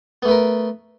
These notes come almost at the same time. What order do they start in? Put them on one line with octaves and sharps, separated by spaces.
B3 A3 B4 A#4